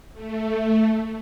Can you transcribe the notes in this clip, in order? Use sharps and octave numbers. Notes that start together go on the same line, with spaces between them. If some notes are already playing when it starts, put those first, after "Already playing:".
A3